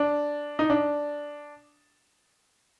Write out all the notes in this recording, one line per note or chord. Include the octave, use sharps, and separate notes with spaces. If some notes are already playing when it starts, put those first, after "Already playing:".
Already playing: D4
D#4
D4